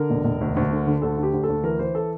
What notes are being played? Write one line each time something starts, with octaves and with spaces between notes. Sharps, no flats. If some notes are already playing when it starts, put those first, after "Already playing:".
Already playing: D3 A#4
E1
E1
D2
D2
D3
D3
D2 A4
D3
G4
D2
A4
D2
E3 A#4
E3 C5
A4